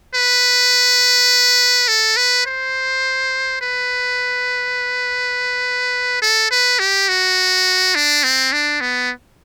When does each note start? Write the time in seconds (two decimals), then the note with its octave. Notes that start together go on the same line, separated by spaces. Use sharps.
0.15 B4
1.88 A4
2.17 B4
2.46 C5
3.61 B4
6.22 A4
6.51 B4
6.79 G4
7.09 F#4
7.95 D4
8.24 C4
8.53 D4
8.81 B3